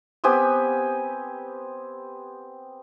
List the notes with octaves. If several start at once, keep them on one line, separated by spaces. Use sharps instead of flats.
B3 C4 G4 G#5